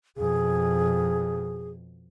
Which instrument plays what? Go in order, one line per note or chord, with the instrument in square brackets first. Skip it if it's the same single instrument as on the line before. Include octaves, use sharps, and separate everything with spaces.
[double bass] F2 B2 [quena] G#4